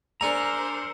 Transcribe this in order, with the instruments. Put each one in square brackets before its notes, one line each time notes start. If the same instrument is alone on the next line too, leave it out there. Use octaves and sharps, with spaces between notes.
[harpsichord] D4 G#5 [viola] A#4 C5 [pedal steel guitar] A#5 [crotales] E6 C#7